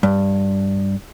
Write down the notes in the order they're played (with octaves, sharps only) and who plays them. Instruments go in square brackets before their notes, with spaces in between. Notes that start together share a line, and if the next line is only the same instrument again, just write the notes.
[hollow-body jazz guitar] G2